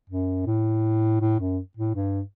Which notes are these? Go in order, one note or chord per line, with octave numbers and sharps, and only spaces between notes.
F#2
A2
A2
F#2
A2
G2